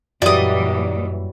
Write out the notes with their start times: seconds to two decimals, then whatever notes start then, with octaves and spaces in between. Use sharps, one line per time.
0.22 F#2 A#2 E3 F#3 G3 D5 D#5